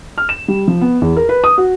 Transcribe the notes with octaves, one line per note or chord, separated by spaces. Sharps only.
F6
E7
G3
F3
B3
E2
A#4
B4
D#6
F#4